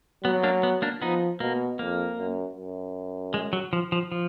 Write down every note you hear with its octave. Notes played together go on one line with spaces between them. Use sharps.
F#3 B3
A#3 D4
B3
A#3 D4
F3 B3 D#4
B2 A#3
F2 A#3
F#2
F#2
G#3
F#3
F3
F3
F3